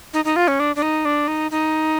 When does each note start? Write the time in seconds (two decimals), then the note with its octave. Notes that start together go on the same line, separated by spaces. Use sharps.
0.14 D#4
0.25 D#4
0.36 F4
0.48 C#4
0.60 D4
0.76 D4
0.82 D#4
1.05 D4
1.28 D#4
1.51 D#4